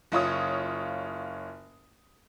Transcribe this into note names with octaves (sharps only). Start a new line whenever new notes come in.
F#1 F4 C#5 D#6